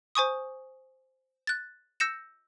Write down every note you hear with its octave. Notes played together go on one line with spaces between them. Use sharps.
C5 G#5 C#6 D#6
F#6 A6
E6 G6 A#6 C#7 E7